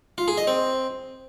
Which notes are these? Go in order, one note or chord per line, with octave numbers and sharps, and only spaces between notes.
F4
G#4
D#5
C4